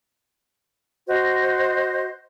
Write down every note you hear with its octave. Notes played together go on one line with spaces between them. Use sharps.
F#4 C5 D#5